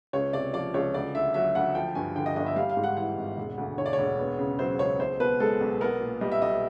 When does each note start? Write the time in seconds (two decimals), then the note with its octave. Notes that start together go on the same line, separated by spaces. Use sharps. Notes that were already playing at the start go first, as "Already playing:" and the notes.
0.13 C#2 C#5
0.33 C3 D5
0.54 F3 D5
0.74 C#2 C#5
0.94 D2 D5
1.14 D3 E5
1.34 F#3 E5
1.55 D2 F#5
1.75 F3 G5
1.95 G2 G#5
2.16 D3 G5
2.26 D#5
2.36 G1 D#5
2.46 E5
2.56 G3 F5
2.69 F5
2.77 G#2
2.84 F#5
2.97 E3 F#5
3.17 G#1
3.37 E1
3.58 D2
3.78 D3 C#5
3.86 D5
3.93 C#5
3.98 E1
4.19 B3
4.39 C#3
4.59 F#3 C5
4.79 C#2 C#5
4.99 B1 C5
5.20 B2 B4
5.40 G#3 A4
5.60 B1
5.81 B3 A#4
6.00 A#2
6.21 G3 D#5
6.32 E5
6.42 B1 D#5